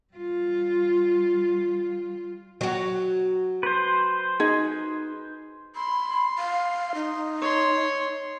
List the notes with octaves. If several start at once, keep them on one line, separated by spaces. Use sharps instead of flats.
G3 F4
F#3 F#4
B4 C5
D#4 G#4
B5 C6
F5
D#4
C#5 C6